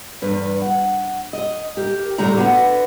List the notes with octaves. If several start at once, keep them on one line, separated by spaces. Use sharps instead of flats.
E2 G2 B4
F#5
D#5
G4 A#4
A2 D3 G3 A3 A#5
D3 B3 F#4